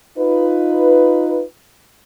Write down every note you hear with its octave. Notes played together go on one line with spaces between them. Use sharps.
D#4 F4 B4